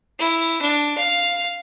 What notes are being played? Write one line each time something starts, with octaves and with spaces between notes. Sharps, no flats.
E4
D4
F5